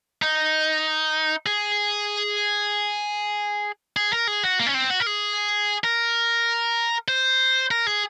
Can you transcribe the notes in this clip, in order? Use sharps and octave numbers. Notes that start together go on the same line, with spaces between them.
D#4
G#4
G#4
A#4
G#4
F#4
A#3
C#4
C4
F#4
A#4
G#4
A#4
C5
A#4
G#4